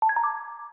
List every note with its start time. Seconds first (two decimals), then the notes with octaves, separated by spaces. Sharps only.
0.02 A5
0.09 G#6
0.16 A#5
0.24 D6